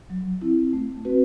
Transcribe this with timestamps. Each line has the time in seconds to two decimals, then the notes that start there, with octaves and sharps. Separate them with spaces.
0.10 F#3
0.41 C4 E4
0.73 A3
1.05 C4 F#4 B4